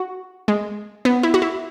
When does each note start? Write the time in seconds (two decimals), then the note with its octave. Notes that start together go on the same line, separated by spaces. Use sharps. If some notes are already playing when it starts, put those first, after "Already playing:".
Already playing: F#4
0.48 G#3
1.05 B3
1.23 E4
1.34 F#4
1.42 E4